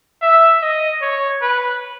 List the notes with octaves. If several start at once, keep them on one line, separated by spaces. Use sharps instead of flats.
E5
D#5
C#5
B4